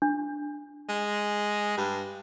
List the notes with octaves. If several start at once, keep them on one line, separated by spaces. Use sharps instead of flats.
D4
G#3
G2